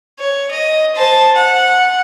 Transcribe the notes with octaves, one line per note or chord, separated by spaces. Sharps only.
C#5
D#5
C5 A5
F#5